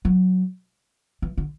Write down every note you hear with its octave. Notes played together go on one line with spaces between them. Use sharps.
F#3
E3
D3